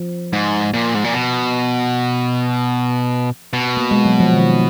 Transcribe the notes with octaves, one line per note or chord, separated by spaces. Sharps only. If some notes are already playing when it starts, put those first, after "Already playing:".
Already playing: F3
G#2
A#2
G#2
A#2
B2
B2
A#3
G#3
F#3
F3
D#3